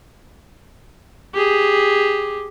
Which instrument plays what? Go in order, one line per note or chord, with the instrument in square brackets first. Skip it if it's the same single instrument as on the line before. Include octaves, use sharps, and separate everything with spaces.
[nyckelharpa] G4 G#4